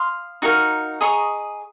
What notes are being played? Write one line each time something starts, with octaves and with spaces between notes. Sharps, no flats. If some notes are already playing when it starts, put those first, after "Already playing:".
Already playing: F5 C6 D#6
D#4 F#4 A#4 F5
G#4 D#5 A#5 C#6